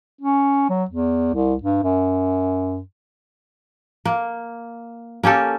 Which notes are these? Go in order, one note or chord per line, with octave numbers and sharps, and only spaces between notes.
C#4
F#3
E2
C2
G2
F#2
A#3
A#3 C#4 G4 A4